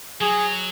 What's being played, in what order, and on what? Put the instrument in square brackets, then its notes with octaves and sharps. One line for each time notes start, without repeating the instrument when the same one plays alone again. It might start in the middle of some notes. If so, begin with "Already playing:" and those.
[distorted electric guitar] F#3 [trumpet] G#4